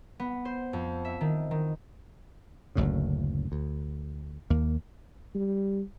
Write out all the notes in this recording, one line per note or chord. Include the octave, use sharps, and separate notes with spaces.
B3
C5
F2
E5
D#3
D#3
F#1 D2 A2 C#3
D2
D#2 A#3
G3